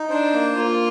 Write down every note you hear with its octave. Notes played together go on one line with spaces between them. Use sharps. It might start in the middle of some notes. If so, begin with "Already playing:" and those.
Already playing: D#4
D4 C5
A#3
A#3 F4